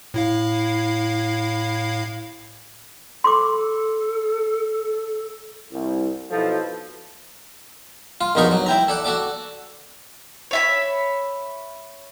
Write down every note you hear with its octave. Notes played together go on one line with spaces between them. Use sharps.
A2 E4 F5
A4 C6 D6
C2
B1 B2 F3 E4 A4
F4
A#1 D#2 B2 D#4 A#4 C#6
F#3
E4 G5 A#5
A4 D5 F#5
F#4 A4 D5 D6
C#5 E5 B5